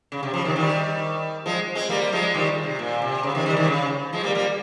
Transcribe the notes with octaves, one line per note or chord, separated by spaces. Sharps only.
C#3
C3
C#3 F3
C3 D#3
D#3 G3
F3 G#3
G#3 C4
G3 A#3
F3 G#3
D#3 G3
C3
A#2
C3
C#3
C3 D#3
D#3 G3
C3 D#3
C#3
F3 G#3
G3 A#3
G3 A#3